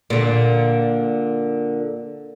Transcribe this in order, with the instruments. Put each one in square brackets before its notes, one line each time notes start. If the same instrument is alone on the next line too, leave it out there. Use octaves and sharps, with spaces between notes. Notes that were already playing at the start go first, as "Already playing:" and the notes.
[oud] A#2 D3